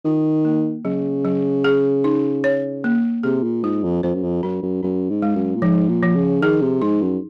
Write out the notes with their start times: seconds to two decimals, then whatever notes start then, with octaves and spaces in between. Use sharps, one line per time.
0.05 D#3 F4
0.45 A#3
0.85 C#3 F#3
1.25 F#3
1.64 G#4
2.04 D#4
2.44 C#5
2.84 A#3
3.23 C3 G#4
3.43 A#2
3.63 G#2 F4
3.84 F2
4.03 F2 C5
4.15 F#2
4.24 F2
4.43 F#2 C#4
4.62 F#2
4.83 F#2 C#4
5.10 G#2
5.22 G#3
5.36 F#2
5.56 A#2
5.62 G#2 F3
5.89 A#2
6.03 F3
6.16 C#3
6.42 D#3 G#4
6.62 C3
6.82 G#2 D#4
7.02 F#2